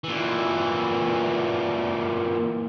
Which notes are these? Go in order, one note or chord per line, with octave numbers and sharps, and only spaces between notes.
A#2 E3